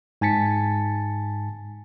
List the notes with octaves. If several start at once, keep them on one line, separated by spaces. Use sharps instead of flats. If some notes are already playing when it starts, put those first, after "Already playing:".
G#2 G#5 A5 A6 B6 C#7